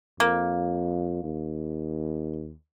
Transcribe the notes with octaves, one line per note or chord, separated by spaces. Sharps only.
F2 A#3
D#2